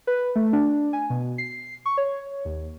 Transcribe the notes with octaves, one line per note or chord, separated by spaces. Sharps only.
B4
A3
D4
G#5
B2
C7
C#6
C#5
D#2